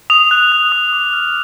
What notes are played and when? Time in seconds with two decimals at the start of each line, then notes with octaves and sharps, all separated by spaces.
0.10 D#6 F7
0.31 F#6
0.52 F#6
0.72 D#6
0.93 D6
1.13 F6